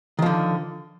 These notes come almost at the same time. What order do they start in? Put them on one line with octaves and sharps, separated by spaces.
D#3 F3 D3